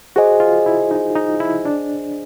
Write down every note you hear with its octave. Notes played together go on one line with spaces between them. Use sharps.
F#4 G#4 C5 D#5 G#5
F4
E4
D#4
D#4
E4
D4